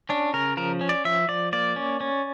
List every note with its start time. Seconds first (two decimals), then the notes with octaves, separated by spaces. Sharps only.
0.09 C#4 D4
0.34 C#3 A#4
0.57 F3 A#4
0.81 C#4
0.89 D5
1.05 F3 E5
1.28 F3 D5
1.53 A#3 D5
1.76 C#4
2.01 C#4